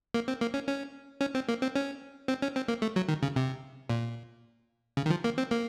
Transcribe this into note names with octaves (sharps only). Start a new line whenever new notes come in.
A#3
C4
A#3
C#4
C#4
C#4
C4
A#3
C4
C#4
C4
C#4
C4
A#3
A3
F#3
D#3
C#3
C3
A#2
C#3
D#3
F3
A#3
C4
A#3